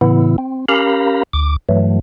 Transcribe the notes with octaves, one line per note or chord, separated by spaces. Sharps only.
A2 C#3 E3 B3 E4
C4
C#4 G4 A#4 F5 A#5 B5
D2 D6
G2 E3 F#3 A3